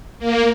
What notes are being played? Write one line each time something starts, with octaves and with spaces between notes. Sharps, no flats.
A#3